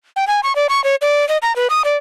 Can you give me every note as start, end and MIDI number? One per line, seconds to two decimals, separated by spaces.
0.16 0.27 79
0.27 0.40 80
0.43 0.55 85
0.56 0.67 74
0.69 0.83 85
0.84 0.95 73
1.02 1.27 74
1.29 1.37 75
1.42 1.55 82
1.56 1.67 71
1.70 1.82 87
1.85 1.97 74